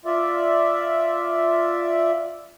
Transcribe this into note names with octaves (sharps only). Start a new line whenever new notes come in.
F4 D5 E5